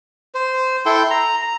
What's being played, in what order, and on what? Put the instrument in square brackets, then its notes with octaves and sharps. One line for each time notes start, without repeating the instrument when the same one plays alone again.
[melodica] C5
E4 A4 G5 C6
A#5
A#5